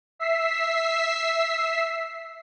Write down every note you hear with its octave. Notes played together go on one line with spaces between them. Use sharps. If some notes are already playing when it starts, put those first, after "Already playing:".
E5 E6 B6 C7